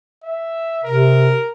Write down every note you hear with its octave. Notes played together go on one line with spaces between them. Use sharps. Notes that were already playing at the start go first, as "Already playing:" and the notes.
E5
C3 A#4